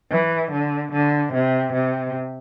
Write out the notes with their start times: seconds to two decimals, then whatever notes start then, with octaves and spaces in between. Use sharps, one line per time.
0.10 E3
0.52 D3
0.92 D3
1.33 C3
1.73 C3